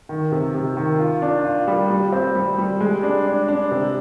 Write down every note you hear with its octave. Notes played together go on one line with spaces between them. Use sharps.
D#3
C3
C3
D#3
F4
D4
F4
G3
G3
C4
G3
G3
G#3
D4
D4
D4
C3